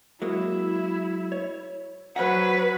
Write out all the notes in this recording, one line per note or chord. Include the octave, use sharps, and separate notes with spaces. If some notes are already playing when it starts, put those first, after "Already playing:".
F#3 G#3 A#3 E4
C#5
F#3 B4 C5 F#5